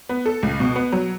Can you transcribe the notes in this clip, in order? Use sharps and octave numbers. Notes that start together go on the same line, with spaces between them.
B3
A4
C#2
B2
B3
F#3